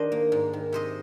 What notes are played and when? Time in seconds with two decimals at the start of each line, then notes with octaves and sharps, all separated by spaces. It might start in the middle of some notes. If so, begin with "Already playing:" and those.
Already playing: D#3 D4 G4 A#4 C5 D#5
0.12 A#3
0.32 G#2
0.53 D#3
0.73 C3 C5 D#5